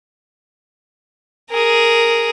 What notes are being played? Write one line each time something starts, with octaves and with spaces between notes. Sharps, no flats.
G#4 A#4